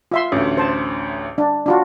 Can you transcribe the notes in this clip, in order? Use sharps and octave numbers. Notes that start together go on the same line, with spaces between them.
F4 E5 C6
A1 D2
C5 A5
D4
D4 F4 F#4